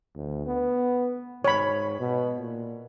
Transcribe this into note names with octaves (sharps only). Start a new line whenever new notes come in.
D2
B3
G#2 C#5 B5
B2
A#2